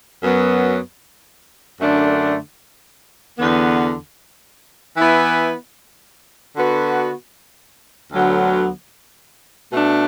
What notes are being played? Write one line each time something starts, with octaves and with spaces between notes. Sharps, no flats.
F#2 F#3 B3
F#2 D3 A3 D4
E2 D3 B3
E3 B3 E4 B4
D3 B3 F#4 B4
D2 D3 F#3 B3
B2 A3 D4